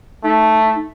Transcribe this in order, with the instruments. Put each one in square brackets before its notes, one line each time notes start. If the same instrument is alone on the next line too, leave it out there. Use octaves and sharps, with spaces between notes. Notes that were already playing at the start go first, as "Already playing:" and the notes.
[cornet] A3 [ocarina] D#4